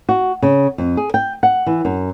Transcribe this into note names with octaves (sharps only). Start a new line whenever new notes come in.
F#4
C#3
F2
G#4
G5
F#5
E3
F#2